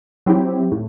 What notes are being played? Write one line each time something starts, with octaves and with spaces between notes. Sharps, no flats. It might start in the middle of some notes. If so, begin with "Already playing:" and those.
F#3 C4 E4 G4
A2